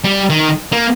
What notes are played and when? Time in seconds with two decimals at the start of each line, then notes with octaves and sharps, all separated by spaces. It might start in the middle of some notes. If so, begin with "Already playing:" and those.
0.04 G3
0.30 D#3
0.72 A#3